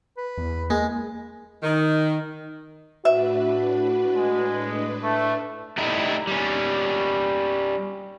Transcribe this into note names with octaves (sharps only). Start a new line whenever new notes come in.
B4
E2
G#3 A#3
D#3
A2 D4 F#4 B4 E5
G#3
A3
G3 A3 D#4 E4
G3 C#4